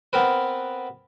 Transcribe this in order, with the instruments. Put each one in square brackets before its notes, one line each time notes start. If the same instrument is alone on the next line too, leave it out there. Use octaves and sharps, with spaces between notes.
[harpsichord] B3 C4 A#4 B4